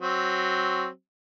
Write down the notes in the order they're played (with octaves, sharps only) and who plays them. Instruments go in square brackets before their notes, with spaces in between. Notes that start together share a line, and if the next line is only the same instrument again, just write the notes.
[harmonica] F#3 C4